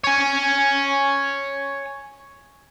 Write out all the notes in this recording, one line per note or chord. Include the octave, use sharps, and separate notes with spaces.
C#5 G#5